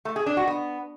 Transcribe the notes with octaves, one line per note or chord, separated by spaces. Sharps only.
A3
G#4
D4
F#4
B3